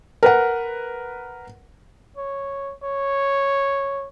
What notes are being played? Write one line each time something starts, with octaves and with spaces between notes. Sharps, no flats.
A#4 B4 F#5
C#5
C#5